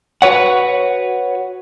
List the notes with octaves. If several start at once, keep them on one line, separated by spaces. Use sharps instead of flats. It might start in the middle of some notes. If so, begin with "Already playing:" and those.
F#4 B4 C#5 F#5